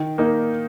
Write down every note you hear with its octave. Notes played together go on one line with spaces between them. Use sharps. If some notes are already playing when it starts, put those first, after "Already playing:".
Already playing: D#3
A#3 D#4 A#4